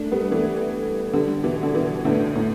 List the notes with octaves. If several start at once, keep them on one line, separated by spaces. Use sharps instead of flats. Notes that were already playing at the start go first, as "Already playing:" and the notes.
Already playing: A3 D4
G3 B3
E3 A3
D3 G3
B2 E3
D3
B2 E3
A2 D3
A2